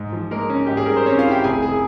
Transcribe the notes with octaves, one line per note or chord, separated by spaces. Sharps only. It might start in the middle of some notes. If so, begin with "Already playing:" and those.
Already playing: G#2
F3
G#3 A#3 A#4
C#4
G#2 G4
G#4
G3 A#4
C5
C4 C#4 C#5
F4 F5
E4
G4 G5
F1 G#4 G#5
G#4 G#5